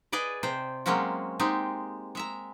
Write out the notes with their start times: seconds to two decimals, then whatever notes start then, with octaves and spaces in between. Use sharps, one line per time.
0.12 G#4 B4 D5 D#5
0.43 C3 C5 G5
0.86 F#3 G#3 A#3 C4 C#4 F#4
1.39 G#3 C4 D#4 G4
2.15 G#3 E5 A#5